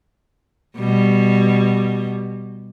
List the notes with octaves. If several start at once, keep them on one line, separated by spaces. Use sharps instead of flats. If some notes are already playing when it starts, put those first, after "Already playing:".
B2 G3